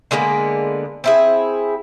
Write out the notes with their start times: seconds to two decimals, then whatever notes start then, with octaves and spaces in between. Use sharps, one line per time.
0.11 D3 G#3 A#3 B3
1.04 C4 E4 G#4